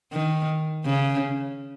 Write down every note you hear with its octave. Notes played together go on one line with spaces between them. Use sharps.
D#3
C#3